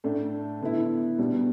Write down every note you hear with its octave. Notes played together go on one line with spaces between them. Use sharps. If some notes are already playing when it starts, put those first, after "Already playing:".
A2 A3 D4
D3 B3 E4
B2 G3 B3 D4